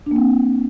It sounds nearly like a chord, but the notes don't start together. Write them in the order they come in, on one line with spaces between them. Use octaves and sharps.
D4 A#3 C4